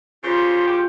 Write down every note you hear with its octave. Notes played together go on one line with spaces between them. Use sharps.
C#3 G3 F4 C5
G#3 C#4 G4